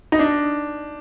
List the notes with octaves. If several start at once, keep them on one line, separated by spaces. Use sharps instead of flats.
D#4
D4